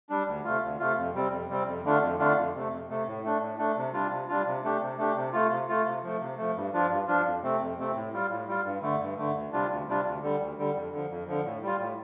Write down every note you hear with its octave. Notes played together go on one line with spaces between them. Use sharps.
G3 D4
D2
C3 A3 F4
D2
C3 A3 F4
F2
C3 G3 C4
F2
C3 G3 C4
F2
D3 A3 D4 F4
F2
D3 A3 D4 F4
F2
C3 A3
F2
C3 A3
A2
A3 D4
A2
A3 D4
C3
G3 D4 F4
C3
G3 D4 F4
C3
A3 D4 G4
C3
A3 D4 G4
C3
A3 F4
C3
A3 F4
C3
F3 A3
C3
F3 A3
G2
F3 D4 F4
G2
F3 D4 F4
F2
C3 A3 C4
F2
C3 A3 C4
A2
G3 F4
A2
G3 F4
G2
D3 A3
G2
D3 A3
D2
C3 G3 D4 F4
D2
C3 G3 D4 F4
D2
D3 G3
D2
D3 G3
F2
D3 F3
F2
D3 F3
A2
G3 F4
A2